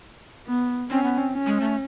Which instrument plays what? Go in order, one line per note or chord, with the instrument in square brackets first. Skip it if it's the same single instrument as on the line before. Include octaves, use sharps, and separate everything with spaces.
[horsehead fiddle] B3
[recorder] C4 [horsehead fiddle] C#4
[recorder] B3
C4
[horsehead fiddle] C#4
[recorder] G#3
A3